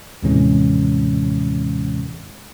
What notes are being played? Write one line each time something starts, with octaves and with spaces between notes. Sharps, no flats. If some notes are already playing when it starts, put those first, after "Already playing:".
D#2 A2 C3 E3 G#3 C#4